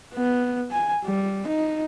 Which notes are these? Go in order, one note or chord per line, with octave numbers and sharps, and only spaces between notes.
B3
G#5
G3
D#4